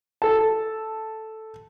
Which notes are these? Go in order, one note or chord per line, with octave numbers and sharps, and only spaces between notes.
A4 A5